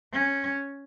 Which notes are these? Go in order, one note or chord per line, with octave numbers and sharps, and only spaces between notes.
C#4